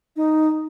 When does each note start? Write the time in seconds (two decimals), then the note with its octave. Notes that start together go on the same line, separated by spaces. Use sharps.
0.16 D#4